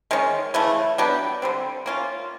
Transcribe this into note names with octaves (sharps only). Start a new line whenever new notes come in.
D#3 G#3 C#4
C#3 E3 A3
F#3 B3 D4 G4
D3 G3 C4
A#3 C#4 F4